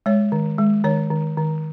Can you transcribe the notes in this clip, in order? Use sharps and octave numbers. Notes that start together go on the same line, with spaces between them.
G#3 C#5
D#3
G#3
D#3 C#5
D#3
D#3